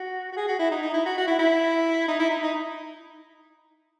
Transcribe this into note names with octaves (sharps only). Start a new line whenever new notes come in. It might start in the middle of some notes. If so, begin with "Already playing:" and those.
Already playing: F#4
F#4
G#4
F#4
E4
D#4
D#4
E4
F#4
F#4
E4
E4
D#4
E4
D#4
D#4